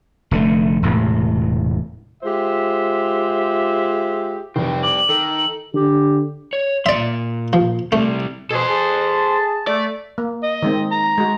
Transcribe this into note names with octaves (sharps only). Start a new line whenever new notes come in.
F1 D3 A3
E1 A2 C3
G#3 F4 G4 C5 E5
F1 G3 C4
D6 F#7
D#3 A4
D3 G4
C#5
A#2 D5 E5 C6
F3
C3 G3 A3
B2 G#4 A4 C5
G#4 A5
A3 D5
A#3
D#5
D#3 G#3 C4
A#5
G#3 F#4